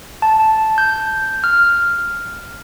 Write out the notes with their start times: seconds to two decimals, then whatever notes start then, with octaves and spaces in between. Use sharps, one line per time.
0.22 A5
0.78 G6
1.44 F6